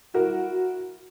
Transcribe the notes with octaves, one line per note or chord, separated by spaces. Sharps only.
E4 F#4 A#4